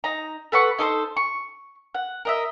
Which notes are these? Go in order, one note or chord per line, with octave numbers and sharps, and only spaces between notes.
D#4 A#5
A4 B4 F#5 C#6
D#4 A4 A#4 C5
C#6
F#5
A#4 D#5 E5